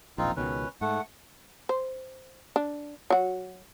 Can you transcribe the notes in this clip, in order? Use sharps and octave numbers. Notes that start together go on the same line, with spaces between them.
E1 A#1 C4 D#4 F4
C#2 B2 D#3 C#4 B4
G#2 A3 F#5
C5
D4
F#3 F#4